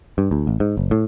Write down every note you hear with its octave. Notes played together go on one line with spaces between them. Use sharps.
G2
D2
A1
G#2
F#1
A2